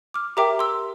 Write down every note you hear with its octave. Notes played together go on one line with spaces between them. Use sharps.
D6 F6
G4 A#4 E5 G5 A#5 D6
C6 E6